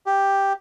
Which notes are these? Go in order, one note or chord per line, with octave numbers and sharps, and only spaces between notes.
G4